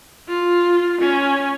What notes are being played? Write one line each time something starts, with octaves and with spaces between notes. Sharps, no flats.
F4
C#4